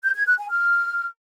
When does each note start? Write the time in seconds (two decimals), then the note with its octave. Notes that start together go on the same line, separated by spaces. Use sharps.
0.03 G6
0.15 G#6
0.26 F#6
0.38 G#5
0.49 F6